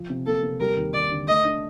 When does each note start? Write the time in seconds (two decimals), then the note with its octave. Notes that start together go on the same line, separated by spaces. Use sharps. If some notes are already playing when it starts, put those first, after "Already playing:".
Already playing: F3
0.10 C3
0.26 A#3 A4
0.43 C3
0.60 G3 A#4
0.77 D#2
0.94 D#2 D5
1.11 D3
1.28 A3 D#5
1.45 D4